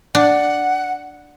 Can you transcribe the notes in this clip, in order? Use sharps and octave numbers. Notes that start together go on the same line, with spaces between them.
D4 F#5